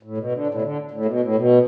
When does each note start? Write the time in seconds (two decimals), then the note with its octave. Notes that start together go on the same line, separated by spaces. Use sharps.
0.03 A2
0.18 B2
0.32 D3
0.47 A2
0.54 B2
0.62 D3
0.91 A2
1.05 B2
1.20 A2
1.35 B2